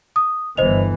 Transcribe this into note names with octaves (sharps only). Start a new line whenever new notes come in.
D#6
G1 E3 C5 D#5 F7